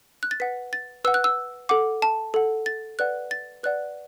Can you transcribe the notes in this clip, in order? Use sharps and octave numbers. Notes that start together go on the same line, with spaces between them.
F#6
A6
B4 F#5 B6
A6
B4 F#5 E6
F#6
E6
A4 F#5 D6
A5
A4 F#5
A6
B4 D5 F#5 F#6
A6
B4 D5 F#5 F#6